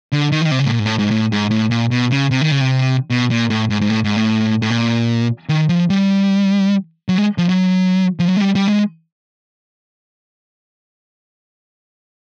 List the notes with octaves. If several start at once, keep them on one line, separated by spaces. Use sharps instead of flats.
D3
D#3
E3
D#3
C3
C#3
A2
A#2
G#2
A2
G#2
A2
G#2
A2
A#2
B2
C#3
C3
D#3
C#3
C3
B2
A#2
A2
G#2
G#2
A2
G#2
A2
A2
A#2
D#3
F3
G3
F#3
G#3
F3
F#3
F3
F#3
G#3
G3
G3
G#3